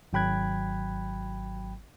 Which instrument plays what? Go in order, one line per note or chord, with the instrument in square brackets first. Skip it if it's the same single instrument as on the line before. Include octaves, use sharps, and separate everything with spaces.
[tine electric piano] G#1 F#3 G5 B5 F#6 G#6